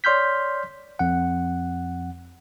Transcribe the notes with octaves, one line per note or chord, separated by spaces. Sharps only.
C#5 D5 C6 F6 G6 B6
F2 F#5